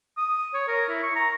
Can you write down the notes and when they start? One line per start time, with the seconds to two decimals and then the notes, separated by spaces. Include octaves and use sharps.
0.17 D#6
0.54 C#5
0.68 A#4
0.89 E4
1.03 C#6
1.16 A#5